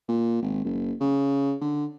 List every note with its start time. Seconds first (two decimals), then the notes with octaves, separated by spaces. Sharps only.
0.09 A#2
0.42 G#1
0.65 F#1
1.01 C#3
1.62 D3